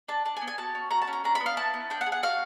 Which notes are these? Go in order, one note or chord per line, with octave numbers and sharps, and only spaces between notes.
D4 A5
D4 A5
G#5
B3
G#5
F#4 A5
C#4
F#4 A#5
A5
C#4
A#5
D4 A#5
B3 B5
F5
E4 A5
B3
D4 G5
F#5
G#4
F#5
F#4 F5